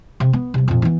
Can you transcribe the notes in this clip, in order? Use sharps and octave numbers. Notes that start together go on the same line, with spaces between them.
C3
B3
C3 G3
F2 A#2
E3 B3